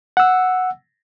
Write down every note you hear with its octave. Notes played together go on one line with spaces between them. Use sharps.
F#5 E6